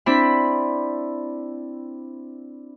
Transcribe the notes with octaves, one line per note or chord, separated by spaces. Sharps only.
C4 D4 E4 B5